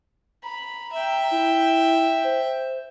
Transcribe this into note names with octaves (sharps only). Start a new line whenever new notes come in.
A#5 B5
E5 G5
E4
C5